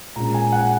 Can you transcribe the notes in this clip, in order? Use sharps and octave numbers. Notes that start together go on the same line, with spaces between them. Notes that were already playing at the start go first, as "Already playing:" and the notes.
A#2 G#3 C#4 A#5
G#5
F#5